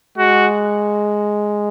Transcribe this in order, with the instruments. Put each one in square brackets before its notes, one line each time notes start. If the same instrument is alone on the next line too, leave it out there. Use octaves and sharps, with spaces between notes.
[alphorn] G#3 [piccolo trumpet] F#4